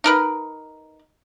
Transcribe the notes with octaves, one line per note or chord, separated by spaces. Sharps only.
D#4 A#4 B4